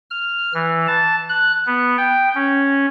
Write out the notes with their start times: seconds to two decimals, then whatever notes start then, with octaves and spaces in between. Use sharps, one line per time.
0.11 F6
0.54 E3
0.87 A5
1.29 F#6
1.66 B3
1.98 G5
2.35 C#4